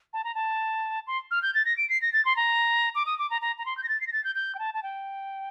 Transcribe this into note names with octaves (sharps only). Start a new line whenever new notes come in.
A5
A#5
A5
C6
F6
G6
A6
A#6
D7
C7
A#6
A6
C6
A#5
D6
D#6
D6
A#5
A#5
A#5
C6
G6
A#6
A6
C7
A#6
A6
G6
G6
G5
A5
A5
G5